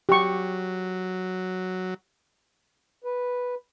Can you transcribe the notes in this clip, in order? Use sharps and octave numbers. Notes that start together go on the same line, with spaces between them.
F#3 G4 C#6
B4